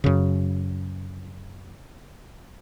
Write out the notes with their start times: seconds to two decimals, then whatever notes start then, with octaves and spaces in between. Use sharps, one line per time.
0.04 F#2 C#3